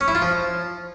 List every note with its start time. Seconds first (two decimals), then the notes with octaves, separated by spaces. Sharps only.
0.01 C#4
0.08 E4
0.15 F4
0.22 F3